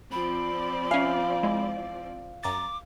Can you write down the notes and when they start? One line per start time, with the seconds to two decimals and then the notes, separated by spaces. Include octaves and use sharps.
0.12 F3 C4 D5 B5
0.91 C#4 F5 G#5
1.43 G#3 E4
2.43 F#2 A#5 D6 A6